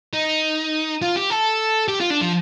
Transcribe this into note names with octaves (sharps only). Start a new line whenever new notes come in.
D#4
F4
G4
A4
G4
F4
D4
F3